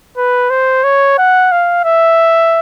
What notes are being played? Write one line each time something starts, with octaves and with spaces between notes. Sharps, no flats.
B4
C5
C#5
F#5
F5
E5